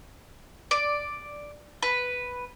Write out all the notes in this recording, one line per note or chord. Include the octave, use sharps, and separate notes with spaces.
D5
B4